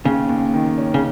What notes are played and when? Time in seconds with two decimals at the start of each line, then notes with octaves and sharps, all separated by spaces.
0.04 D#2 C#3
0.29 D#2
0.54 D#3
0.78 C#4
0.94 C#3